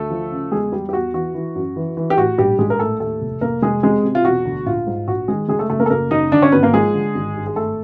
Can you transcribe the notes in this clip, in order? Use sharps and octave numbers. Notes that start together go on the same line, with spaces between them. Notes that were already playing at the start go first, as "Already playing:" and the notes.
Already playing: D2 A3 A4
F3
C#3
E2 G#3 G#4
E2 G3 G4
G4
E2 F#4
E3 F#4
E3
F#2
E3
E3
G4
A2 F#4
A#1 G3 G4
A#1 G#3 G#4
A#4
A2 A3 A4
D#2 A3 A4
F1
F1 A#3 A#4
F1 G#3 G#4
C3 G#3 G#4
C3
F4
E1 F#4
D2
A#1 F4
G#2
A#1 F#4
D#3 G#3 G#4
F#1 G#3 G#4
A3 A4
F#1 A3 A4
A#3 A#4
A4
F#1 A#3 A#4
F#1 D#4 D#5
D3 D4 D5
C#4 C#5
G#1 B3 B4
A#3 A#4
F3 G#3 G#4
D3
G#1
G2
G#4
G#1 A3 A4